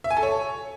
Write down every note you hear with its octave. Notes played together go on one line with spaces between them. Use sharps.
E5
G#5
A4
C#5